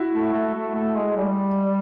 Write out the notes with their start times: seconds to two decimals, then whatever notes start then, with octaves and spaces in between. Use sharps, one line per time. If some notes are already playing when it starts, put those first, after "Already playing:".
Already playing: E4 F#4
0.13 A3
0.33 A3
0.54 A3
0.75 A3
0.96 G#3
1.17 G3